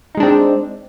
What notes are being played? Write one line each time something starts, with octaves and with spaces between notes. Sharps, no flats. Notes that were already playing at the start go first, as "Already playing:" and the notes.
G#3 C4 D4 D#4